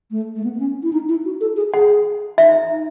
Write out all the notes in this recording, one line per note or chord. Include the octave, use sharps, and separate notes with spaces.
A3
A3
B3
B3
C#4
E4
D#4
E4
F#4
A4
G#4
G#4 F#5
D#4 E5